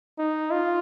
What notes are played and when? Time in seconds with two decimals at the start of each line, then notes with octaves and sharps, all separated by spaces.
0.19 D#4
0.51 F4